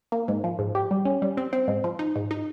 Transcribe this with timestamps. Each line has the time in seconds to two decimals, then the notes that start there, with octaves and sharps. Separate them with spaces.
0.12 A#3
0.28 G#2
0.44 F3
0.59 G#2
0.75 G4
0.91 G3
1.05 C#4
1.22 G3
1.37 C4
1.53 C4
1.68 G#2
1.84 F3
1.99 D#4
2.16 G#2
2.31 D#4